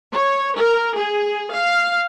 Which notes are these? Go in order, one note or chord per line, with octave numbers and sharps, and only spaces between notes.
C#5
A#4
G#4
F5